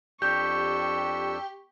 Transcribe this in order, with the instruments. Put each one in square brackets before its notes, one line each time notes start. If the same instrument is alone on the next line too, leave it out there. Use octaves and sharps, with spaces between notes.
[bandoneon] F2 D4 E6 [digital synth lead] G4 [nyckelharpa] C#6 [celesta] G6